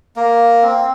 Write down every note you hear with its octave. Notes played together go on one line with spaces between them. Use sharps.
A#3
C4